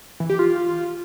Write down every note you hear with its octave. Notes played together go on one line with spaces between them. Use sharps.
E3
G4
F4